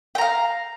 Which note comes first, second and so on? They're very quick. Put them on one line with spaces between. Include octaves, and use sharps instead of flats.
G5 A#5 F5